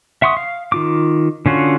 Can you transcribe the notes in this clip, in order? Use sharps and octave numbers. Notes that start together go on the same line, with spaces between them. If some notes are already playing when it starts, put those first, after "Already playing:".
E5 F#5 C6 C#6 D#6
F5
D#3 F4 D6
D3 C#4 F4 F#4